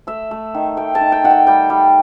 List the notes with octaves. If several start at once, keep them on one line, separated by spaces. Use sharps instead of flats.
A3 E5
A3
D#3
A3 G5
A5
D#3
G5
D#3 F#5
G5
G3 G5
G3